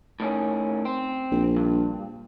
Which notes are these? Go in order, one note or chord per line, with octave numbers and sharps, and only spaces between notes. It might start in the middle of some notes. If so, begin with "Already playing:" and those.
A2 D#3 C#4
C4
A#1
G2